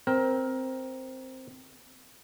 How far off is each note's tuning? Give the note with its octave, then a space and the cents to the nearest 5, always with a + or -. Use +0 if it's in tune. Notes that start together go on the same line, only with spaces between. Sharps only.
C4 +0 A#4 +15